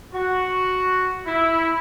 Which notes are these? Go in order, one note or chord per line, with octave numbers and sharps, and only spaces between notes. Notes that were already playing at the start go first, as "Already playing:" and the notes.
F#4
E4